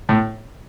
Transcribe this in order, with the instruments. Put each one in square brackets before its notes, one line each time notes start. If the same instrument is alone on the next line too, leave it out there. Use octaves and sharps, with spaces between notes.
[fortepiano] A2